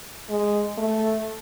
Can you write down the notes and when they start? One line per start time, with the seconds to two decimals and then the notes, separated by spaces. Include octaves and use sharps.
0.30 G#3
0.77 A3